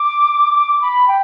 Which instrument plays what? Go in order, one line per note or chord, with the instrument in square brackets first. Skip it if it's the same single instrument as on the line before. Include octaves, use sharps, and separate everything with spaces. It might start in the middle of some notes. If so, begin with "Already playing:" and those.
Already playing: [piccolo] D6
B5
G5